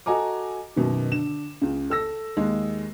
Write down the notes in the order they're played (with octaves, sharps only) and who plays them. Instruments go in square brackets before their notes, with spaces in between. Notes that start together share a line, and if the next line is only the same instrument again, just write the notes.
[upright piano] F#4 A4 D#5 G#5 A#5 D6
F#2 B2 D#3
D3 E7
C#2 C#3
A4 E6 A#6
D#2 G#3